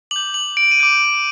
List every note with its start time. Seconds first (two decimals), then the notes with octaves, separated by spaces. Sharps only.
0.11 D6 G6 F#7
0.34 F#7
0.57 D7
0.71 D#7
0.80 D6 G6 D7